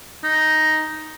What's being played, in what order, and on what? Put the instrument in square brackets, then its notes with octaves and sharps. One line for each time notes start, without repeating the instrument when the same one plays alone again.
[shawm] D#4